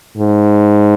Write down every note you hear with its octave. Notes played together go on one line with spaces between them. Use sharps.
G#2